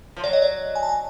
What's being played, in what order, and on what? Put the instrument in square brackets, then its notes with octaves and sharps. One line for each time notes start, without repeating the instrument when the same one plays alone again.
[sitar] F3
[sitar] F#3 [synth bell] D5
[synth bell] D#5
D5
G#5
A5
G#5